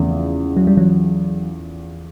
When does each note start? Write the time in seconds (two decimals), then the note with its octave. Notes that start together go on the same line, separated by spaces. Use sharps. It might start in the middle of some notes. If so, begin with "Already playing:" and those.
Already playing: E2 C#3 F3 A3
0.57 F#3
0.67 G3
0.77 E3 F#3